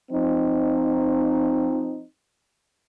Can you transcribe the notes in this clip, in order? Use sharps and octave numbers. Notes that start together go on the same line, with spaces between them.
F3 C4 D#4